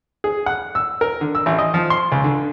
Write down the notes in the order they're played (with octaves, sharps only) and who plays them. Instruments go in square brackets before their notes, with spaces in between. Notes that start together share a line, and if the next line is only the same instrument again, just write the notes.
[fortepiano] G#4
F#5
E6
A#4
D3
E6
A1
D#5
F3
C6
C#2
D3